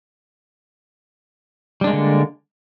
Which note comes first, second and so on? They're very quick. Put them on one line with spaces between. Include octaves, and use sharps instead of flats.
G3 D4 G#3 A#3 D3